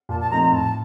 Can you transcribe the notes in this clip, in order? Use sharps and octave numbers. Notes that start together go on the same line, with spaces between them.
A#2 A5
A5
F3 A3 C4 D#4 A#5
A#5
A2 A5